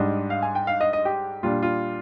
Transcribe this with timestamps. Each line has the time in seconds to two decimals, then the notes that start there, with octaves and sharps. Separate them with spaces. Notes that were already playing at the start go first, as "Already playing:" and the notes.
Already playing: G#2 G3 D4 D#5
0.30 F5
0.43 G#5
0.55 G5
0.67 F5
0.81 D#5
0.93 D#5
1.05 G4
1.43 A#2 G3 D4 F4
1.62 F4